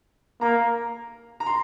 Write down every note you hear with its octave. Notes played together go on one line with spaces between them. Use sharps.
A#3 A#5
A#5
C6